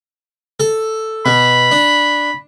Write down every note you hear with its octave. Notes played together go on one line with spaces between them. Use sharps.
A4
B2 B5
D4